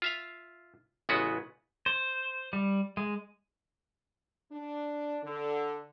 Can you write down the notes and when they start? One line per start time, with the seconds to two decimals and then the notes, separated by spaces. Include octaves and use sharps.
0.02 F4 E5 F5
1.09 A1 C#3 G#3 B3 F#4 B4
1.86 C5
2.53 G3
2.97 G#3
4.52 D4
5.23 D3